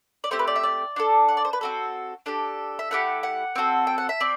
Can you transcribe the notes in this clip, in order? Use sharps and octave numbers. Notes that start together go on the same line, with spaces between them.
D5
A3 C4 G4 C5
B4
D5
E5
D5
D4 F#4 A4
F#5
D5
C5
B4
C4 F#4 A4
D4 G4 A4
E5
A3 E4 G4 F#5
F#5
C4 F#4 A4
G5
F#5
E5
C4 D5